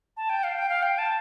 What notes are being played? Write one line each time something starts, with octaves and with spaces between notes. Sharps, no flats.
A5
G5
F5
G5
F5
G5
A5